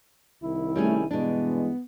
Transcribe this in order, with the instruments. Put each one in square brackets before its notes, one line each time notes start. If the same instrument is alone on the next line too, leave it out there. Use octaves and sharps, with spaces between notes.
[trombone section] C2 D#3 E4
[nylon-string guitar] G3 C#4 G#4 [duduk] A3
[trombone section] G2 E3 G#3 [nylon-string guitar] B2 D4 [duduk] B3